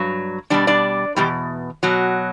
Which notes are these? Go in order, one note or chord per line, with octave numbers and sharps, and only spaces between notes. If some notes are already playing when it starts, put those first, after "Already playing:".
Already playing: G2 F#3
B2 G3 D4 D5
D4 D5
E2 B2 G3 G4
B2 F#3